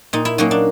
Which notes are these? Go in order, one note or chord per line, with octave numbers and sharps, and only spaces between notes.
A#2 D#4
E4
F#3 A#3 C#4 D#4
D4